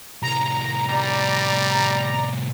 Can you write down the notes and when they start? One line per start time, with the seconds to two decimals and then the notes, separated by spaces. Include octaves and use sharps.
0.22 C2 A2 A#5
0.89 G3 D5